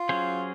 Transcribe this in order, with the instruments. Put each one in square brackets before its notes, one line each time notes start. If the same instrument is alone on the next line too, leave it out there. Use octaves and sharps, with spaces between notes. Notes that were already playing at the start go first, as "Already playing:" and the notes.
Already playing: [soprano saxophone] F4
[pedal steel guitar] F#3 C#4 G#4 C5